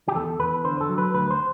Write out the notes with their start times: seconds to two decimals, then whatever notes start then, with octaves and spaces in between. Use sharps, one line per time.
0.08 G4
0.15 E2 A4
0.40 E2 B4
0.64 D3 C5
0.81 A4
0.89 F#3
0.98 B4
1.14 D2 B4
1.31 C5